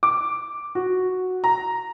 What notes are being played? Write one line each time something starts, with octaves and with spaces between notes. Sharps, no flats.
D6
F#4
A#5